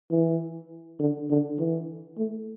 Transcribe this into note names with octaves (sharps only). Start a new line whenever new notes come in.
E3
D3
D3
E3
A3